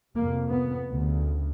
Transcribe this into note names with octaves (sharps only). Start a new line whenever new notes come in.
F2 C3 A#3
B3
D2 C#3